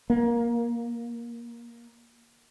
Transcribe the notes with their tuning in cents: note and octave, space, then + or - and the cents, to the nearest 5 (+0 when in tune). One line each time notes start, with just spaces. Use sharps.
A#3 +15